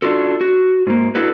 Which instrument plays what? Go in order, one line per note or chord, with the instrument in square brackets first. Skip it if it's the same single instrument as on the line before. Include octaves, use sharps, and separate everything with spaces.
[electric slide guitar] D4 F4 F#4 A4
F#4
G#2 A#3
D4 E4 F#4 A4 B4